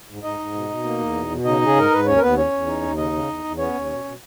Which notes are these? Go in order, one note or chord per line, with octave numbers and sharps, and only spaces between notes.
G#2
G#2 D#4 D#5
G#2
B2
B2
A#3
E2
B2
B2
C#3 D#4 D#5
C#3 G#4
G#2 A#4
G#2 B4
D#2 C#4 C#5
A#4
D#2 B3 B4
E2 C#4 C#5
E2
D#4
D#2
C#3 D#4 D#5
C#3
E2
E2
B3 C#4 C#5
D#2
B2
B2